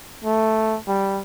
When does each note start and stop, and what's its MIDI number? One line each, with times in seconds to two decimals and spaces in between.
0.24 0.79 57
0.87 1.21 55